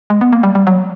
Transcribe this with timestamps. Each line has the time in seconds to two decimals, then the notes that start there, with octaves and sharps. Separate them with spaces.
0.10 G#3
0.21 B3
0.33 A#3
0.43 G3
0.55 G3
0.67 F#3